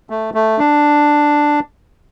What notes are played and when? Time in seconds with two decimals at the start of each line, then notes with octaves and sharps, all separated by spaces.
0.10 A3
0.34 A3
0.58 D4